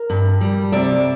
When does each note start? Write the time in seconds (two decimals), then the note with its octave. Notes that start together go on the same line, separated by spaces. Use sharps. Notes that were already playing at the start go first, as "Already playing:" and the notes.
Already playing: A#4
0.10 G2
0.41 G3
0.72 C3 D5 E5